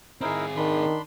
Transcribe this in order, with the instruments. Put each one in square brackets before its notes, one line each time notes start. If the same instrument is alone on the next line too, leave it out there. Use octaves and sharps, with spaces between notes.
[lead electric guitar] C4 G#4 [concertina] D#4 E4 A#4
[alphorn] D#3 [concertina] D4 B5 C6